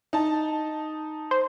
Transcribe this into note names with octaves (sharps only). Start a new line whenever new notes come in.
D#4 A5
C5